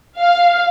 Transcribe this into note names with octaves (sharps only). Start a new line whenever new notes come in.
F5